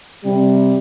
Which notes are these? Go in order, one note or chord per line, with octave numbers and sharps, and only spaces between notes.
C3 G3